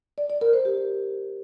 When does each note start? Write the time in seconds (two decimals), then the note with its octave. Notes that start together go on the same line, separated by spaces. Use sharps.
0.18 D5
0.30 D5
0.41 A#4
0.53 C5
0.65 G4